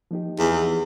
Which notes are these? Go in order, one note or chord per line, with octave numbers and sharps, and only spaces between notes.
F3 A#3 D#4 G4
E2